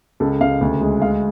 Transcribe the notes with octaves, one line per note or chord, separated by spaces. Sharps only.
C#2 A4
C#2 F5
D2
G#3
G#3 F5